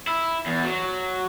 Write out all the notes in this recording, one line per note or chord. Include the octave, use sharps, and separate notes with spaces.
E4
E2
F#3